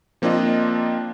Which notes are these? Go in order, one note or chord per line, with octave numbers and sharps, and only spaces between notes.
F3 A#3 C4 D4 F4 D#5